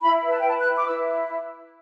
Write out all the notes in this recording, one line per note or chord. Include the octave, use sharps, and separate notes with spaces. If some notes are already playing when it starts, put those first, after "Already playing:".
E4 B5
B4
A5
G5
B4 A5
F#6
E4
D6
E4 E6